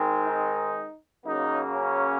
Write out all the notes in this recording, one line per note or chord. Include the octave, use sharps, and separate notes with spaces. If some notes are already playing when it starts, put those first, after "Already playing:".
Already playing: D#3 G#3 C4
D#4
C#3 F#3 A#3 D#4
C#4